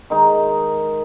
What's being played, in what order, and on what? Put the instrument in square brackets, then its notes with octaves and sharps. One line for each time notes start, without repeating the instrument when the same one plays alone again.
[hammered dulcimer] D#3 G#3 D#4